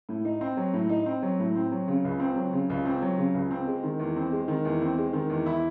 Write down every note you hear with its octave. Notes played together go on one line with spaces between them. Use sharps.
A2
D#4
C4
F#3
A2
D#4
C4
F#3
A2
C4
F#3
C#3
C#2
C4
F#3
C#3
C#2
C4
F#3
C#3
C#2
C4
G#3
D#3
E2
C4
G#3
D#3
E2
C4
G#3
D#3
E2
E4